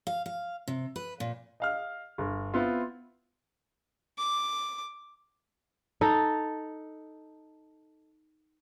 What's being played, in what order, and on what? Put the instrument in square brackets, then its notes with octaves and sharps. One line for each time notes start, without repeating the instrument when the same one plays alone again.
[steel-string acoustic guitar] F5
F5
C3
B4
A#2
[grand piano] D#5 F5 F6
G1
B3 C4 E4 F4
[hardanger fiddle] D6
[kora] D#4 A4 D#5